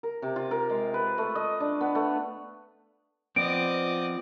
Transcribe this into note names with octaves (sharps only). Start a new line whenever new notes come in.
A#4
C3
F4
A#4
G#3
B4
A3
D#5
D4
B3
A3
F3 B3 C4 D5 D#5 D7